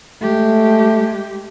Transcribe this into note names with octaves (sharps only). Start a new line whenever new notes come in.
G#3 A3 G4